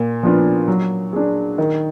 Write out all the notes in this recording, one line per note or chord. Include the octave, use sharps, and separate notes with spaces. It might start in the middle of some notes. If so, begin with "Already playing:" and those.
Already playing: A#2
F3 B3 D4 F4
F#3
D4 G#4
D#3